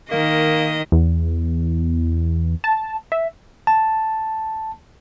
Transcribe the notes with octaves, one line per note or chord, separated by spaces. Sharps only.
D#3 A#3 D#5
E2
A5
E5
A5